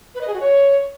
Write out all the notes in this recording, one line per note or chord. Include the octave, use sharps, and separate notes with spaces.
B4
D#5
G#4
F#4
C#5